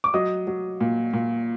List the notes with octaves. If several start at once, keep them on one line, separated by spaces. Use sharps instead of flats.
D6
F#3 D#5 D#6
F#3
A#2
A#2